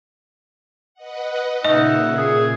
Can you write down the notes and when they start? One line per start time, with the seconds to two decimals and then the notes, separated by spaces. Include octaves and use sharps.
0.94 B4 D#5 F#5
1.65 A#2 C#3 D#4 D#5 E5 F#5
2.17 G#4